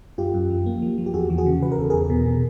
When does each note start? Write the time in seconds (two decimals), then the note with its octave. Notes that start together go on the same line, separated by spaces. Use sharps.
0.18 F#2 F4 G4
0.34 F#2
0.50 F3
0.66 A#3
0.82 F3
0.98 F3
1.06 G4
1.14 E2 F#4 G#4
1.30 E3
1.38 F#4 G#4
1.46 C#3
1.62 C#3 B4
1.72 A#4
1.78 E2 A4
1.90 E2 G#4 A#4
2.10 B2
2.26 B2